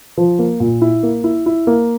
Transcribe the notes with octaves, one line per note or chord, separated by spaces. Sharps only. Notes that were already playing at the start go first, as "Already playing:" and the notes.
F3
A#3
A#2
E4
A#3
E4
E4
A#3